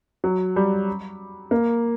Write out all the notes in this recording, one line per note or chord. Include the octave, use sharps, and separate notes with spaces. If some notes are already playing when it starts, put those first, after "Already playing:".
F#3
G3
A#3